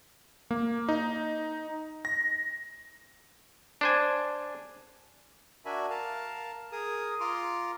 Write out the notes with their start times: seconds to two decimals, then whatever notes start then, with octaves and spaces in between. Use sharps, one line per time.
0.51 A#3
0.89 D#4
2.05 A#6
3.81 D4 C5 G#5
5.65 D4 F#4 A#4 E5 G#5 B5
5.90 A#4 F5 A5
6.72 G#4 A#4 D#6
7.20 F4 A#5 C6 D6